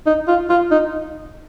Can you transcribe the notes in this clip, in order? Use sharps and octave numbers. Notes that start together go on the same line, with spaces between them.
D#4
F4
F4
D#4